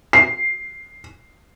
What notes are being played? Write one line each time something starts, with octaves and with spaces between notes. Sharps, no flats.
C7